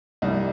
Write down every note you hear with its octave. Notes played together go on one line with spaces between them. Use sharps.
C2 C3 G3 D#5
D#5